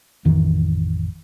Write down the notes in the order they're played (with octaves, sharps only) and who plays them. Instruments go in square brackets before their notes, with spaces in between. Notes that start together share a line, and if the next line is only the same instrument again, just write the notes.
[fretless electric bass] A1 F2 D#3 E3